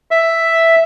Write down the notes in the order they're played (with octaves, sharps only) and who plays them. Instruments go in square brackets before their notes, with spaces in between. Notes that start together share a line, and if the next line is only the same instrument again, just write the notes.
[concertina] E5